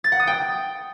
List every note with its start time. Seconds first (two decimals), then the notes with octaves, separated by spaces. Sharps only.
0.04 A6
0.12 F#5
0.20 D#6
0.27 G5